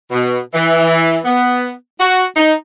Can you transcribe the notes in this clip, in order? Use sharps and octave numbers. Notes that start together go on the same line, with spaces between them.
B2
E3
B3
F#4
D#4